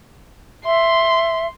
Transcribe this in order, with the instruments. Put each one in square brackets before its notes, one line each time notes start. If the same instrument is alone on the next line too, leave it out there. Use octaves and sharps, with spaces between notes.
[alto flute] E5 [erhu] C6